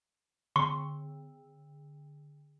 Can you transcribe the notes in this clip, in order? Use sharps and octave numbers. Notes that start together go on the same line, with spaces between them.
D3 C6 C#6